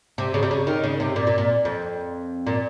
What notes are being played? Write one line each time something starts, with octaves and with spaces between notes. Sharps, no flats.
C3
C#3
C3
C#3
D#3
C#3
C3
A#2
A#2
A#2
F2
A#2